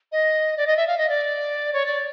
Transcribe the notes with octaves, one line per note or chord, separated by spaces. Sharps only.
D#5
D5
D#5
E5
F5
D#5
D5
C#5
D5